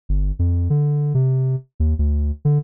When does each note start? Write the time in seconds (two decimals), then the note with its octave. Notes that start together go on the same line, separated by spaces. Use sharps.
0.09 G1
0.39 F2
0.70 D3
1.15 C3
1.80 D#2
1.99 D2
2.45 D3